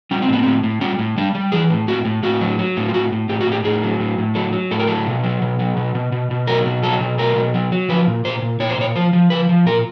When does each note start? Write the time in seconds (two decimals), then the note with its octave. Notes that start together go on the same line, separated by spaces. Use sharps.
0.11 G3 C#4
0.22 C4
0.28 A2 B3
0.43 A2 C4
0.63 A2
0.81 G3 C#4
0.99 A2
1.18 G3 D4
1.35 G3
1.52 E3 G#4
1.70 A2
1.88 A2 F#4
2.05 A2
2.23 A2 F#4
2.41 F#3
2.59 F#3
2.77 A2
2.89 F4
2.94 A2 F#4
3.12 A2
3.29 A2 G4
3.41 F#4
3.46 A2
3.52 G4
3.64 A2 G#4
3.83 F#3
4.00 A2
4.18 A2
4.35 F#3 A4
4.53 F#3
4.71 A2 A4
4.79 A#4
4.87 F#3 A4
5.07 B2
5.23 F#3
5.42 B2
5.59 F#3
5.77 B2
5.95 B2
6.12 B2
6.31 B2
6.47 F#3 A#4
6.65 B2
6.83 F#3 A4
7.01 B2
7.18 F#3 A#4
7.37 B2
7.54 F#3
7.72 F#3
7.89 F3 B4
8.07 A#2
8.25 A#2 C5
8.42 A#2
8.60 A#2 C#5
8.70 C5
8.77 A#2 C#5
8.95 F3 C5
9.13 F3
9.30 F3 B4
9.49 F3
9.66 A#2 A#4